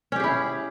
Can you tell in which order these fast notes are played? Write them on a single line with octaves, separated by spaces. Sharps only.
C#4 G4 G#4 E4